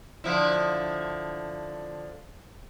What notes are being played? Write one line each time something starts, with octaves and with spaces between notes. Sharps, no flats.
D3 F3 E4